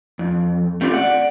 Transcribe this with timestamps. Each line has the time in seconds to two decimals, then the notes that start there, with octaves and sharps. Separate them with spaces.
0.19 F2
0.81 A3 C4 F4 G4
0.94 D5 F#5